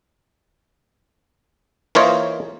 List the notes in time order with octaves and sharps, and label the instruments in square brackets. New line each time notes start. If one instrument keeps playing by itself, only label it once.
[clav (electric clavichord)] E3 A#3 F4 C5 C#5 D#5